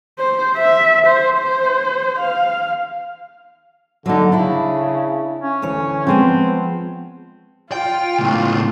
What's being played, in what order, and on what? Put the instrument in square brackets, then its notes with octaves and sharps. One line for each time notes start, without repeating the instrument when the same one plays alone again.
[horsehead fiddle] C5
E5
C5
C5
F5
[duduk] D3 [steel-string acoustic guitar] F#3 A#3 D#4
[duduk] C#3 [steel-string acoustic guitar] D4 E4
[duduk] C#4
[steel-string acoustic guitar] D2 E3 C#5
[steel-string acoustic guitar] F3 G#3 B3 [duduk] C4
[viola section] F4 [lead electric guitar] G5
[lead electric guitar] C#2 A2